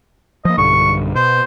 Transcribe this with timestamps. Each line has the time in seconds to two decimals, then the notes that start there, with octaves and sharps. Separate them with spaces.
0.45 F3 A#3 D#5
0.58 B1 G2 D3 C#6
1.15 B2 C5